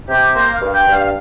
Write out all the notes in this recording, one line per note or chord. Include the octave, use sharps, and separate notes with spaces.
C3 G4
A#3 C5
F5
G2
G5
G2
F5